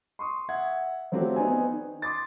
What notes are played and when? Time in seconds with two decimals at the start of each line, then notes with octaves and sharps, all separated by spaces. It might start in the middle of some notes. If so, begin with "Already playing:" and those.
0.19 C6 C#6 D#6
0.49 E5 F#5 G#6
1.12 F3 F#3 A3 C4 F#4 G4
1.36 B3 C4 D#4 D5 G#5
1.72 D#3
2.02 C6 D6 D#6 A6